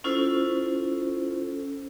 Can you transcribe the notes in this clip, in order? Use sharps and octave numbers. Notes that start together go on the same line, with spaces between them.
C#4 E4 F4 A4 C5